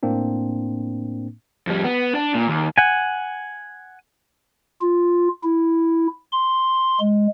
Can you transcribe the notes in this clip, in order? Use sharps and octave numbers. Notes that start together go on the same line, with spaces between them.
A2 A#3 C4 D4
F2 G3
B3
D4
A#2
D#2
F#5 G#5
F4
E4
C6
G#3